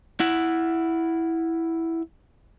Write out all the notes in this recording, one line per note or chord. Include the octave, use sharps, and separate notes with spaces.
E4 F#5